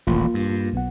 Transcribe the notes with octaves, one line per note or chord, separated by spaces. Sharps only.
D#1 A1 A#3 F4
G2
B1 B3 F#5